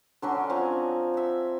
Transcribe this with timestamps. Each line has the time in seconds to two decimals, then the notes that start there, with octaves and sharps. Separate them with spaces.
0.22 D3 F#3 C#4
0.50 F3 C4 G#5 A#5
1.14 E5 F#5